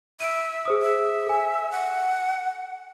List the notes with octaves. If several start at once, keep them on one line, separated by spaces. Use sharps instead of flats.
E5 D7 D#7
G#4 C5 D#6
E5
A4 G#5
F#5